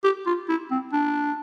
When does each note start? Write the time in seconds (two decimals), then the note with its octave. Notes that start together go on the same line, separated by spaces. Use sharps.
0.04 G4
0.26 F4
0.49 E4
0.71 C4
0.93 D4